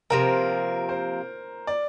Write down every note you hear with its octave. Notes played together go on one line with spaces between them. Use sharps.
C3 F3 A#3 A#4
C5
D5